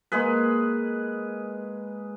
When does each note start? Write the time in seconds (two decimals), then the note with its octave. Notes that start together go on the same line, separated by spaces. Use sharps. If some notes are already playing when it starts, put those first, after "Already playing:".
0.12 G#3 A#3 G#4 B4